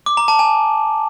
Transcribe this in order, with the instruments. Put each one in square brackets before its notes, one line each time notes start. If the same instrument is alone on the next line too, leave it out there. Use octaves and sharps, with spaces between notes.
[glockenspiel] D6
A#5
A5
G#5